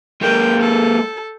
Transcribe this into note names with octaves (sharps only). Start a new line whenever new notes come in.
G#3 A#3 G5
A4